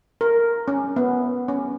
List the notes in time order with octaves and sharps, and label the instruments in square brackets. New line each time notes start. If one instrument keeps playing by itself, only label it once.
[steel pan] A#4
C#4
B3
C#4